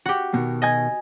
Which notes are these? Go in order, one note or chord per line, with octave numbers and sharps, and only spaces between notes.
F#4 G4
B2 D#3
D#5 G#5 G#6